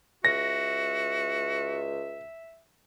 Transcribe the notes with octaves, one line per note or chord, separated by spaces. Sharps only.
C#2 F#4 E5 A#6